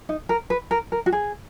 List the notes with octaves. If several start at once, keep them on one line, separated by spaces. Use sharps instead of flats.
D#4
A#4
B4
A#4
A#4
F#4
G#4